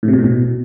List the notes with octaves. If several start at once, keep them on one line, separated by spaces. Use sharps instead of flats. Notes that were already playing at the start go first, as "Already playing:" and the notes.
A2
C3
B2
A2
B2